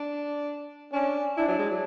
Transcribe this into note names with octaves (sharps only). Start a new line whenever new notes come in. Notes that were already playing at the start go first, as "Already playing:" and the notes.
Already playing: D4
C#4 D4
D4 E4
F#3
G#3
F#3